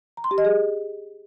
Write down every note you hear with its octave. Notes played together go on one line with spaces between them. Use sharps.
A#5
C6
G4
D#5
G#4